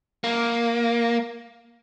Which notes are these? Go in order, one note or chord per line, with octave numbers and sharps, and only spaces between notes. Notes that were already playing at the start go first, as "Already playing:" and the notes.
A#3